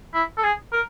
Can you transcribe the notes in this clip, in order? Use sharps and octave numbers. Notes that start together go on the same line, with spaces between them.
E4
A4
G#4
A#4